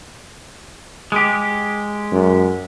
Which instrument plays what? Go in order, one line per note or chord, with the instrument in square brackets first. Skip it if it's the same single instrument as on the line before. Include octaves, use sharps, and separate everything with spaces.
[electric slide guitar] G#3 G4
[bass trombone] F#2